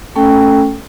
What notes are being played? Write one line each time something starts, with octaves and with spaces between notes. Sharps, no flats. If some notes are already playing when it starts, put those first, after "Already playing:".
A3 C#4 A4 G5